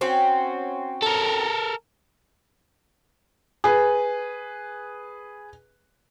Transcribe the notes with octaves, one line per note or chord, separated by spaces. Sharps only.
C4 C#4 F#4
A4 A#4
G#4 B4